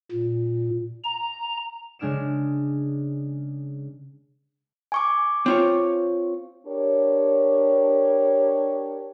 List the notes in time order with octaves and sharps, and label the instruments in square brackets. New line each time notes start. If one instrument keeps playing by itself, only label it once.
[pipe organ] A#2
A#5
[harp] C#3 G#3 D4 F6 D7 E7
[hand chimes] G#5 C#6 D6
[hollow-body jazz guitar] C4 F4 C#5
[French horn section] D4 G4 A#4 C#5